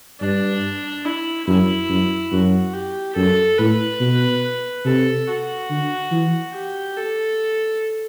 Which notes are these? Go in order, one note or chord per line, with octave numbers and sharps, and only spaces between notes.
G2 D4
E4
F#2 E4
F#2
F#2 F#4
G4
F#2 A4
A2 B4
B2
C3 A4
F#4
D3
E3
G4
A4